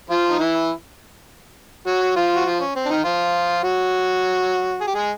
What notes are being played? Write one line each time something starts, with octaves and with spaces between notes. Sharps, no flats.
F3 F4
D#4
E3 E4
F#3 F#4
F3 F4
F#4
F3 F4
C#4
C4
D4
D#3 D#4
F3 F4
F#3 F#4
G#4
G4
G#3 G#4